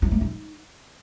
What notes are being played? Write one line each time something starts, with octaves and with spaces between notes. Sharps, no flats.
E4
A3
D#4